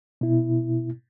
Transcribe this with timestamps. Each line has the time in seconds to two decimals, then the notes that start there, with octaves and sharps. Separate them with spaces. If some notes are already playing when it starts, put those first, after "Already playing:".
0.21 B2 E4